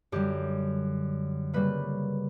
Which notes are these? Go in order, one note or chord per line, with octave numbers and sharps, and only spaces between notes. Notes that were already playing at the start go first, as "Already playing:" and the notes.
F#2 D3 G3 G4
C#3 G3 A#3 B4